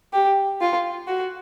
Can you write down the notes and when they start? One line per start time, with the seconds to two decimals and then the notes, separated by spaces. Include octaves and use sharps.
0.13 G4
0.61 F4
1.07 F#4